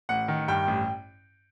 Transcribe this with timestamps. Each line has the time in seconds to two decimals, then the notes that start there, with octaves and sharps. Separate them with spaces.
0.09 A1 F#5
0.28 D#3
0.48 G2 G5
0.68 A1